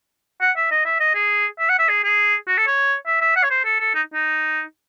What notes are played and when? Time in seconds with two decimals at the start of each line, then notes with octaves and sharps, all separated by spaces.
0.41 F#5
0.56 E5
0.71 D#5
0.85 E5
1.00 D#5
1.15 G#4
1.59 E5
1.69 F#5
1.79 E5
1.89 G#4
2.04 G#4
2.48 F#4
2.57 A4
2.67 C#5
3.06 E5
3.21 E5
3.36 F#5
3.43 C#5
3.50 C5
3.65 A4
3.80 A4
3.95 D#4
4.14 D#4